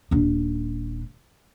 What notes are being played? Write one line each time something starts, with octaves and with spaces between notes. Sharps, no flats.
D#1 D4